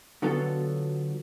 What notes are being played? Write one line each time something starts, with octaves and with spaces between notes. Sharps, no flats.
D3 F#3 B3 F4 A4